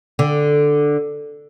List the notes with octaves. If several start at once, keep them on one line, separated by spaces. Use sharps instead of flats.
D3